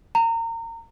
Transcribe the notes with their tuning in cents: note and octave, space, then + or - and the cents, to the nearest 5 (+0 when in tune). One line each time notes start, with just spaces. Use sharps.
A#5 -30